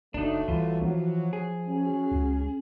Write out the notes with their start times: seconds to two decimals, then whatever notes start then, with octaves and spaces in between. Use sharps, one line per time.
0.14 F#1 F#3 A3 D4 D#4
0.48 C2 E3 F4
0.82 F3 F#3
1.33 G#4
1.67 F#3 C#4
2.11 C#2